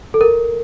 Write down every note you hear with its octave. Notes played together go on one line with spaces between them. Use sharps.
A4
A#4